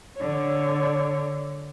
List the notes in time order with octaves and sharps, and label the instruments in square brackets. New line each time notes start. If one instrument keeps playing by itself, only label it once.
[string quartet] D3 C#5